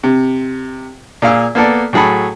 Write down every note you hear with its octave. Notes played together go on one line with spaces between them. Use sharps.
C3
A#2 G#4 F5 E6
A#3 B3 A4 D5
A2 F#3 G#4 A4 B5